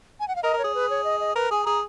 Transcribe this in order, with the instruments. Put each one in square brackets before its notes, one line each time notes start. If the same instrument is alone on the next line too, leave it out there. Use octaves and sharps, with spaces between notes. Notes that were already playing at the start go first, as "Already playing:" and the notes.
[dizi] G#5
F#5
F5
[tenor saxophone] A#4 [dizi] D#5
[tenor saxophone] A#4 [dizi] C#5
[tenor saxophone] G#4
[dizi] B4
C#5
D#5
D#5
[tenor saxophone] A#4 [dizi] B4
[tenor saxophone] G#4 [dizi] G#5
[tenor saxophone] G#4 [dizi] A#5